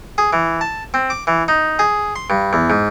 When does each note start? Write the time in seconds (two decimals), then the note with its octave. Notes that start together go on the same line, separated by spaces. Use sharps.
0.18 G#4
0.33 E3
0.61 A5
0.94 C4
1.10 D6
1.27 E3
1.48 D#4
1.79 G#4
2.16 C6
2.30 G2
2.53 E2
2.70 G#2